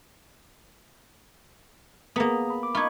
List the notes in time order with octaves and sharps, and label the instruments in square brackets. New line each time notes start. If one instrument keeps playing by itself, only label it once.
[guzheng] A#3 B3 [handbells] G#4 A#5 D#6
[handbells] B5
D6
[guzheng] D#4 F4 [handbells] B5 C#6 G#6